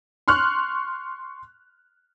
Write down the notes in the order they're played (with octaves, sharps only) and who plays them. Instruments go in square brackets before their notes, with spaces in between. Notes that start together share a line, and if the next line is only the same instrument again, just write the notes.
[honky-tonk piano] C6 C#6 F6 F#6